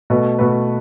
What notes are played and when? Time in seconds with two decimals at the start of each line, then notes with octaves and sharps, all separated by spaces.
0.10 B2 A3 F#4 B4
0.39 B2 A3 F#4 B4